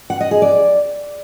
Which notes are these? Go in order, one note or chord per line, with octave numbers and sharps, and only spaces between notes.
F#5
D#5
G#4
D5